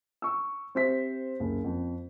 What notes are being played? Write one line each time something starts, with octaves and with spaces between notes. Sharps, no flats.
C#6 E6
C4 G4 C5 E5 B6
F#1
F2